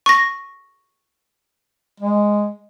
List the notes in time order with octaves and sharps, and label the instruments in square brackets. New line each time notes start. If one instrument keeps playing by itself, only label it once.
[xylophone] C#6 A#6
[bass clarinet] G#3